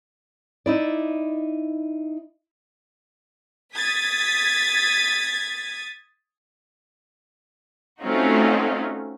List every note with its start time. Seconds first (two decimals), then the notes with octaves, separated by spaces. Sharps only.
0.66 D#4 E4 D5
3.75 D#6 G#6 A6 B6
8.03 A3 C4 C#4 D#4 F4 F#4